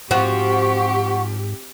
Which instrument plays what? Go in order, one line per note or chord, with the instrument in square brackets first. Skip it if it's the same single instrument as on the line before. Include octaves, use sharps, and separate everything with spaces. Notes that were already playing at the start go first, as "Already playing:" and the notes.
[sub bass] G#2 [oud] F3 F#4 [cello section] C4 G4 [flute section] F#5 C#6